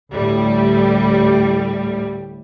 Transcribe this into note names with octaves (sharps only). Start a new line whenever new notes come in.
D2 A2 G3